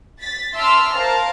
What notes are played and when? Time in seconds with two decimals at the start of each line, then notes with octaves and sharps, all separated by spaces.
0.21 A6 B6
0.53 E5 A5 C6 D6 E6 F6
0.93 A#4 C5 F5 A5 A#5